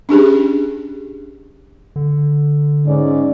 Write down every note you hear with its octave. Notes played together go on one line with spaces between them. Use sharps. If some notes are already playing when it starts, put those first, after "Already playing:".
C#4 D4 G4 G#4
D3
G#2 C#4 D5